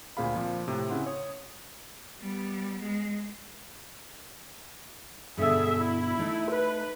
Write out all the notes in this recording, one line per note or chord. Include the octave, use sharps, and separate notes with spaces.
D2 A#2 C4 G#4 F5 B5
A#2 F3
A2 C3
C#3 E4 F#5 C6
C#5 D#6
G3 B3
G#3
G2 B2 D3 G#4 A4 E5
E4
A3 D#4
B4